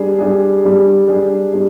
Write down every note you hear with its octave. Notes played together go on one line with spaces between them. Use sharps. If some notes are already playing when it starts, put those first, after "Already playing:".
Already playing: G3 D4 G#4
G3 D4 G#4
G3 D4 G#4
G3 D4 G#4
G3 D4